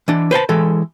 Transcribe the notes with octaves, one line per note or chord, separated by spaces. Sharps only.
E3 D4
B4 C5 F5 A5
E3 G#3 A4